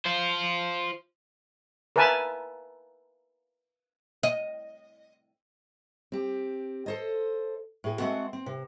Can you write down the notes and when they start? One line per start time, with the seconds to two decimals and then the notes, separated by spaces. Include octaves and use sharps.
0.06 F4 C5
1.96 A#4 B4 E5 G#5 A5 B5
4.23 D#5
6.12 C4 G4
6.86 A4 C5 D#5
7.84 A2 G#4
7.99 G#3 A3 C4 F#4 F#5
8.33 C4
8.46 C3